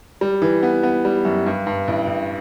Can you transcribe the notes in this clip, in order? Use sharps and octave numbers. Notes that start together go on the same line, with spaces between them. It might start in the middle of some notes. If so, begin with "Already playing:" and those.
G3
E3
B3
B3
G3
F#2
G2
G2
A1
A1